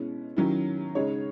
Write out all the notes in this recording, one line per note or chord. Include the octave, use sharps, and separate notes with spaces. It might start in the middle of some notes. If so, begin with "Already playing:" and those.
Already playing: B2 G#3 C#4 E4
D#3 F#3 C#4 E4
C#3 G#3 D#4 C#5